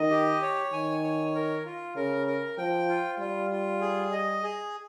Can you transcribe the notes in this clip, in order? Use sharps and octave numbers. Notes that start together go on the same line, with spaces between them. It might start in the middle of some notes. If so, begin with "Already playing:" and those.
Already playing: D#3 D#5
G4
C#5
D#3 G#5
C#5
A#4
F4
C#3 A#4
A#4
F3 G5
F4
G3 F4
F4
G#4
D#5
G#4